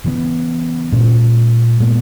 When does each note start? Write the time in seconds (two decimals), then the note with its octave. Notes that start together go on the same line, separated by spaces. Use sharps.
0.04 C#3 E3 B3
0.92 A#2 G#3 C#4
1.80 A#2 G#3 B3